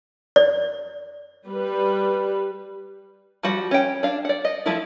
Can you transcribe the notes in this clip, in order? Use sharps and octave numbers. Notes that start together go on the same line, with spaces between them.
D5
G3 B4
F3 G3 F#4 F#5
C#4 G5
D4 F5
D5 F#5
D#5
F3 A3 E4